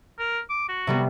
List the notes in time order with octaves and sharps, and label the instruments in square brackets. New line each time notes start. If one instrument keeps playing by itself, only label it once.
[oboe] A#4
D6
F#4
[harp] C3 G3 B3